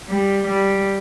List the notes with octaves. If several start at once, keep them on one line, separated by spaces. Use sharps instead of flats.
G3
G3